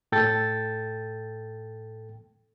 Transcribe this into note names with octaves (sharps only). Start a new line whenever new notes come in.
A2 A4 G5 A6